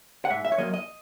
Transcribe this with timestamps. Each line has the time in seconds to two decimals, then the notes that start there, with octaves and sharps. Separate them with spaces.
0.25 F#5
0.30 G#2 E5
0.45 E5
0.52 C#5
0.58 F#3 A#3 D#5
0.74 D#5